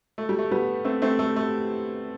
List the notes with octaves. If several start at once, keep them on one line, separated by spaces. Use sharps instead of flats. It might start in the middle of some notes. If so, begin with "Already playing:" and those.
A3
G3
A3
G3 B3
A3 C4
A3 C4
A3
A3